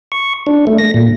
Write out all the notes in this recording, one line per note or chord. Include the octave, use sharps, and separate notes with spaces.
C#6
D4
A3
A#6
A#2